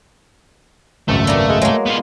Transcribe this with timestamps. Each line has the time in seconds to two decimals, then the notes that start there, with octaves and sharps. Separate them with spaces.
1.08 G#1 C#2 F#2 A3
1.27 A#3 B3 D4
1.49 G#3
1.62 F#3 G#3 A#3
1.86 B3 F4